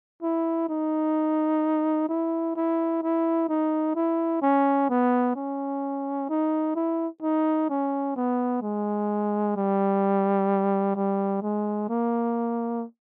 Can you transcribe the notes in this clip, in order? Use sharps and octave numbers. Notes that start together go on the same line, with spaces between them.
E4
D#4
E4
E4
E4
D#4
E4
C#4
B3
C#4
D#4
E4
D#4
C#4
B3
G#3
G3
G3
G#3
A#3